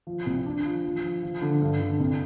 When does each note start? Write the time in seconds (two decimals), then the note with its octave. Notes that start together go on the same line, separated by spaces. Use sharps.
0.07 F3
0.26 C2
0.46 D4
0.65 F3
0.85 F3
1.04 F3
1.23 F3
1.42 D3
1.62 G2
1.80 D3
2.00 C2